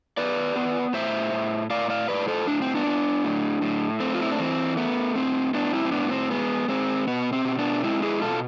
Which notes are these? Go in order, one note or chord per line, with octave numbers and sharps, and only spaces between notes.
B3 B4 D5
B3
A2 C5 E5
A2
A2 D5 F5
D5 F5
A2 B4 D5
A4 C5
A2 D4
C4
B3 D4
B3
A2
A2
A3 C4
F4
E4
D4
E3 C4
A3 B3
A2 C4
A2 B3 D4
C4 E4
C4
A2 B3 D4
C4
G#3 B3
G#3 C4
B2 B3
C4
B2
B3 D4
G#3 C4 E4
E4 G#4
B2 F4 A4